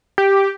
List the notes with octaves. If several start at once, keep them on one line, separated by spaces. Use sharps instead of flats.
G4